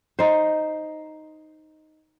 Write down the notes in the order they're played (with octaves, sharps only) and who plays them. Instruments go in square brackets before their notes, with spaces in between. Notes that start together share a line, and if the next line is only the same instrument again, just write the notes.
[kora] D#4 C5